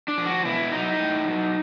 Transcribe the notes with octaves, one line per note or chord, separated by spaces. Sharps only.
D4
F3
F#4
B2 E4
F#3 D#4
A2
F#3